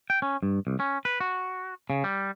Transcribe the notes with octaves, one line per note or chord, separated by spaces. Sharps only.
G5
C#4
G2
C2
C#4
B4
F#4
C#3
G3